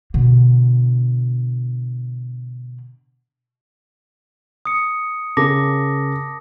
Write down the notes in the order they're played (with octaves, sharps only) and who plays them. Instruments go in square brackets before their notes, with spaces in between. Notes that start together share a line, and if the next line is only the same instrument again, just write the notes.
[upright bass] B2 D3
[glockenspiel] D#6 C#7
[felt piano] C#3 A#4 [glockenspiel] A5 D6 A#6